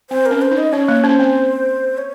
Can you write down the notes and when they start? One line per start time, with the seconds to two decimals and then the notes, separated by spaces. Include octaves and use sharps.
0.10 C4 C5
0.26 A#4
0.31 C#4
0.42 C5
0.51 D#4
0.58 D#5
0.73 C#4 C#5
0.88 A#3
1.04 C#4 C5
1.19 C4
1.98 C#5